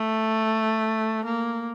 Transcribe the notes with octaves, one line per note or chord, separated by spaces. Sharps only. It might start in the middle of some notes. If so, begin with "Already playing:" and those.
Already playing: A3
A#3